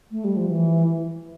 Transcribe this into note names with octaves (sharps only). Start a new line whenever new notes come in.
A3
G3
F3
E3